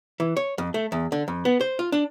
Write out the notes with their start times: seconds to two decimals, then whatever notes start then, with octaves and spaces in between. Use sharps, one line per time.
0.20 E3
0.37 C#5
0.58 F2
0.74 A3
0.92 E2
1.12 D3
1.28 F2
1.45 B3
1.61 C5
1.79 F4
1.92 D4